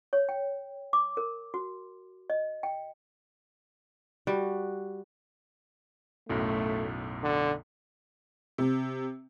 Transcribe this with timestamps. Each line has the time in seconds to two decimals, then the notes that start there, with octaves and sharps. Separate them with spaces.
0.13 C#5
0.29 G5
0.93 D6
1.17 A#4
1.54 F#4
2.30 D#5
2.63 G5
4.27 G3 F#4
6.29 B1 F#2 A2 A3
7.23 D3
8.58 C3